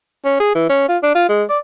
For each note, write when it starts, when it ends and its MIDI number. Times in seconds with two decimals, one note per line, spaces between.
0.25 0.36 61
0.40 0.51 68
0.55 0.66 52
0.69 0.85 61
0.89 0.97 65
1.03 1.10 62
1.15 1.25 65
1.29 1.43 56
1.49 1.58 74